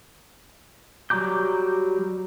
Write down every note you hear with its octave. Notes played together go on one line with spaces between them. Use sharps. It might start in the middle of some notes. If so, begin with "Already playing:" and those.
F#3 G3 A#5 D6 G6